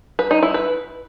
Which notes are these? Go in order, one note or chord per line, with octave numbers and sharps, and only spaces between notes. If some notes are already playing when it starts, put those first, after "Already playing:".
B4
D#4
E4
B4